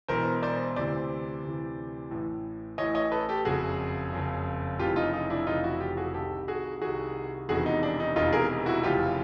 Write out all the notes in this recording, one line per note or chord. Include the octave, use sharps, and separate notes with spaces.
E1 E2 B2 A#4 C5
C5 D5
D2 C3 E3 C5 D5
D2 C3 E3
A1 A2 E3
A1 A2 E3 C#5 D#5
C#5 D#5
A4 B4
G4 A4
F#1 F2 C#3 F#4 G#4
F#1 F2 C#3
F1 F2 C#3 E3 F4 G4
D#4 F4
D#4
D4 E4
F1 F2 C#3 E3 D#4 F4
E4 F#4
F4 G4
F#4 G#4
C2 C3 D#3 G4 A4
F#4 G#4
C2 C3 D#3 F#4 G#4
E1 E2 C3 D#3 F#4 G#4
D#4
D4
D#4
E1 E2 C3 D#3 D#4 F4
G#4 A#4
E4 F#4
F1 F2 C#3 E3 F4 G4